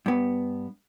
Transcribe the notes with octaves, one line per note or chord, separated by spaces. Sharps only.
G2 B3